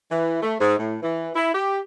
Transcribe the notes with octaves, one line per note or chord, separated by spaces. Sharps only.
E3
A3
G#2
A2
E3
E4
G4